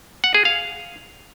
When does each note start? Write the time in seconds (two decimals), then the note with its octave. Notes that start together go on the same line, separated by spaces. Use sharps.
0.24 F#5
0.34 G#4
0.45 F5